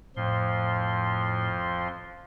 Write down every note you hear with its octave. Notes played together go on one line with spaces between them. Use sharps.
F2 A2 F3 C6